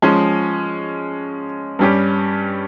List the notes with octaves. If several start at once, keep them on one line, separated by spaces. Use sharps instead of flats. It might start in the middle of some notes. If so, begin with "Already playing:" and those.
F3 G#3 C#4
G2 G3 C#4 G4